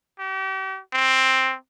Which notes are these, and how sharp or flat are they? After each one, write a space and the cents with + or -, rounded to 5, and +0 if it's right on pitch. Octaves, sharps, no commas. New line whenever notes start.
G4 -40
C4 +5